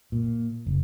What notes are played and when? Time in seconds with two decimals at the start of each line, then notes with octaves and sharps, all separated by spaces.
0.12 A#2
0.67 F#1